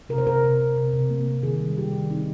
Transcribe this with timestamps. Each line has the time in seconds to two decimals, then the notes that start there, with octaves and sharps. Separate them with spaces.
0.09 C3 A#4
0.18 C5
0.26 C3 A#4
0.44 C3
0.60 C3
0.76 C3
0.93 C3
1.10 A#3
1.28 C3
1.43 D#3 G#4
1.60 G3
1.77 G3 G4
1.93 D#3
2.10 C4 D#4